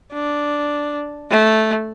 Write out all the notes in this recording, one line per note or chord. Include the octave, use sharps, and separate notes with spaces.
D4
A3